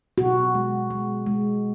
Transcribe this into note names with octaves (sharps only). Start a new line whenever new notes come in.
B2 F#4
G#3
G#3
G#3